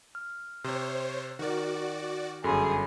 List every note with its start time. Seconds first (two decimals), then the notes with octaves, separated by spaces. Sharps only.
0.15 F6
0.64 C3 C5 C#5
1.39 D#3 F#4 A#4 D5
2.44 G1 F#2 G#4 A4 B5 C6